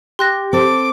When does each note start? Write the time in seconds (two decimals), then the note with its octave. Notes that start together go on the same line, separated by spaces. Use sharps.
0.19 G4 C6 F#6 A#6
0.53 C4 A4 C5 D6